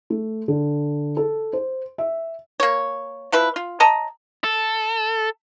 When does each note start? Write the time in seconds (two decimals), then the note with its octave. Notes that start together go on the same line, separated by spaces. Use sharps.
0.10 A3
0.48 D3
1.17 A4
1.53 C5
1.98 E5
2.60 A#3 C#5
3.32 F3 E4 B4
3.56 F4
3.80 C#5 D#5 A5 A#5
4.44 A4